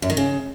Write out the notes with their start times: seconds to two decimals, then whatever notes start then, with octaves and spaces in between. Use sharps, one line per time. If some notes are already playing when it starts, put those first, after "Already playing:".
0.02 F#2
0.10 D#3
0.17 C#3